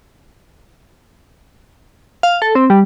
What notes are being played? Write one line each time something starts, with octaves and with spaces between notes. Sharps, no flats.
F5
A4
C4
G3